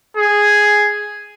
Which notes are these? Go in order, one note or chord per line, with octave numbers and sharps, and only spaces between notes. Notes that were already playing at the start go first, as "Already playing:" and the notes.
G#4